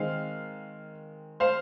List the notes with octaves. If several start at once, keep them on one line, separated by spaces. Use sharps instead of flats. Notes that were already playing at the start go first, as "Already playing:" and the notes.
Already playing: D#3 G#3 C4 F5
C5 F5